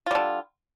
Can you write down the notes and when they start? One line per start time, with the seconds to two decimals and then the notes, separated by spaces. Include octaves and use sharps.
0.06 F4
0.11 G3
0.15 D3